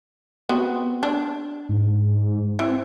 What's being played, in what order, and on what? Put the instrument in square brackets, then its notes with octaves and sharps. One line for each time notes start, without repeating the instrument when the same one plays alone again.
[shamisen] B3 C4 F#4
D4
[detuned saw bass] G#2
[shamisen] E3 [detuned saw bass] C4